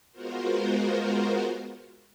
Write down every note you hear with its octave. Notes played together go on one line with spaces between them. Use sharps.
G#3 B3 F4 F#4 A#4 C5